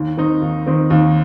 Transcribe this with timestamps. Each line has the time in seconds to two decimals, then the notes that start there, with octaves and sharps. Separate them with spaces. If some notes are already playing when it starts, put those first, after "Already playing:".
Already playing: D#2
0.17 D#3 C4 D#4
0.41 D#2
0.67 D#3 C4 D#4
0.90 D#2